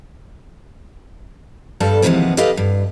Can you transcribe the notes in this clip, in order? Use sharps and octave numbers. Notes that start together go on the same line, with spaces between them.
G2 G3 A4 A5
D#2 C3 E3 F3 G#3 B3
G4 A4 B4 D#5 F5
G2